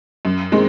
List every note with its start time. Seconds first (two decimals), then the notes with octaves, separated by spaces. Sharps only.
0.25 F#2
0.52 D#3 G#3 C4